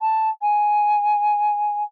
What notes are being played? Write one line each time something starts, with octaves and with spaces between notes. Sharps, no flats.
A5
G#5